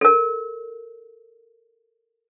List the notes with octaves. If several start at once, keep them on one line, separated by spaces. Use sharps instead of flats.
A4 A#4